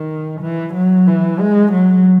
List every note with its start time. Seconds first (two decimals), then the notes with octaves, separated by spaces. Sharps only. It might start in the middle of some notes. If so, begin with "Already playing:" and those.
Already playing: D#3
0.41 E3
0.75 F#3
1.07 E3
1.40 G#3
1.73 F#3